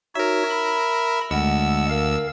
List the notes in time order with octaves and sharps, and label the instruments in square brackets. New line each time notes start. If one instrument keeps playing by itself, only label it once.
[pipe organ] D#4 F#4 C#5 [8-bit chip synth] A#4 E5
[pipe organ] B5
[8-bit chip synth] D2 E6 [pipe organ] G#3 F#5
[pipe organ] A#4 F5